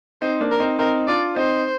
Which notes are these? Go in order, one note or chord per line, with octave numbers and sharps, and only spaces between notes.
C4 D#4 C5
A#3 D4
A#4
C4 D#4
C4 D#4 A#4
D4 F4 D5
C4 D#4 C5